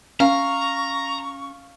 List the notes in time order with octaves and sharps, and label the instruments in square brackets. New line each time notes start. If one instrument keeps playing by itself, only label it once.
[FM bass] C#4 [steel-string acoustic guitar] F5 [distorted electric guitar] A#5 [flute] C#6